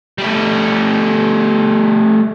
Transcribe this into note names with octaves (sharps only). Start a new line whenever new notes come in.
G3 A3